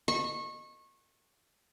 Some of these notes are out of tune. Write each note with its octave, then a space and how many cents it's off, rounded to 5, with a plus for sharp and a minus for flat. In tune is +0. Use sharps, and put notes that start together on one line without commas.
C#6 -25